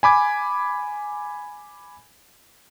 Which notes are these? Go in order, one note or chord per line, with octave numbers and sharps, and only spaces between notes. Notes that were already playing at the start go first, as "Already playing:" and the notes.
G#5 B5 D6 G#6